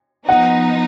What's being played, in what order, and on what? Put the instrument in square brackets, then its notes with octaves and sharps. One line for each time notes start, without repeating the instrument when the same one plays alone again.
[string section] F3 B3 D#4 [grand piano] F#5